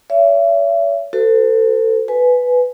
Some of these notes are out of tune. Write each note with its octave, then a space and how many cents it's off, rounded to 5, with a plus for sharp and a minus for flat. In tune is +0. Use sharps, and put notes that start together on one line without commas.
C#5 +45 E5 +35
F#4 +20 A4 +25 C5 -35
B4 +5 G#5 +15